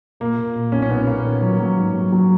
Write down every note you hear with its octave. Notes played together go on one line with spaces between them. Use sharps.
A#2 A#3
A#2
A#2
B1 C#4
C#4
A#2 B3
A#2 A#3
D#3
F#3
F#3
G#2
F#3
F#3